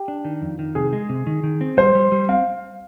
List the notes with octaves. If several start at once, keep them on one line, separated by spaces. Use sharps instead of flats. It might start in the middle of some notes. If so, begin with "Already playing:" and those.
Already playing: G4
D4
D#3
F2
D#3
C3 G#4
G#3
C3
D#3
D#3
C4
G3 C5
G3
G3
C4 F5